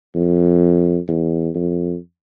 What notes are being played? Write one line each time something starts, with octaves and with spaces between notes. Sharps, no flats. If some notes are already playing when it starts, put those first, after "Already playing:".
F2
E2
F2